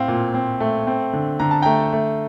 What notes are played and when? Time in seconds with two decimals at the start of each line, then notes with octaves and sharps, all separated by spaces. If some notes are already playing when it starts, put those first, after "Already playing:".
Already playing: A2 C4 F5
0.08 A#2
0.34 C4
0.60 A3
0.87 C4
1.13 D3
1.40 D3 A#5
1.51 A5
1.62 A3 G5 A#5
1.93 A3